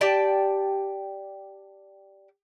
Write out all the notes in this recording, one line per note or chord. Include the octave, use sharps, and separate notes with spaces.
G4 D5 G5 A5